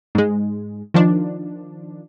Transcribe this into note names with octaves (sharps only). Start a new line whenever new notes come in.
G#2 G#3
D#3 F3 D4